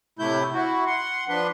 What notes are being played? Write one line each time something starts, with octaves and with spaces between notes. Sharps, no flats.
A2 C3 A3 E4 G6
E4 F#4
F#5 C6
F3 D4 B4 C6